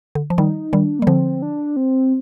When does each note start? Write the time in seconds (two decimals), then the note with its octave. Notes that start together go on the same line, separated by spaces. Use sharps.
0.15 D3
0.30 F3
0.38 D#3 G3 D#4
0.73 D#3 G3 D4
0.99 A#3
1.02 G3
1.07 D3 F3 C4
1.42 D4
1.76 C4